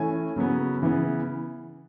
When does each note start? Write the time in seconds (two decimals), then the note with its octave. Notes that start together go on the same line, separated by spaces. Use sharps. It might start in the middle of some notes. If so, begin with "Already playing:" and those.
Already playing: E3 A3 C#4 G#5
0.36 C#3 F#3 B3
0.82 C#3 E3 B3